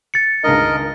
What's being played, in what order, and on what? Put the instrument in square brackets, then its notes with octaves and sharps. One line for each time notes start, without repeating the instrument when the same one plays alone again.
[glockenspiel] A6 C#7
[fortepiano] C#2 G2 D#3 [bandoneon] A#4 D#5